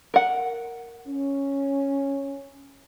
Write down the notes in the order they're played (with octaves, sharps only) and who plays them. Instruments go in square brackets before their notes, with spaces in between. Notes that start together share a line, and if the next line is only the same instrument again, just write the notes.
[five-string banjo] A#4 F#5
[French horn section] C#4